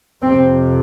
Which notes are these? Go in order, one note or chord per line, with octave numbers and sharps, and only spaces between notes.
F2 C3 C4